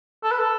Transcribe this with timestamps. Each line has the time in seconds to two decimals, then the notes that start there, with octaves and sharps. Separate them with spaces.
0.23 A4
0.31 B4
0.39 A4